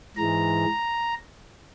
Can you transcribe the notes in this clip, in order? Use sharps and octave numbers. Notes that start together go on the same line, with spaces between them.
G#2 E3 G#3 A#5